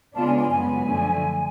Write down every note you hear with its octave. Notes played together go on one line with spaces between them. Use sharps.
C#3 G#3 B3 D4 F4 A5
G#5
G#5
F#2 C#3 G#3 B3 G#5
F#2 D3 F3 A3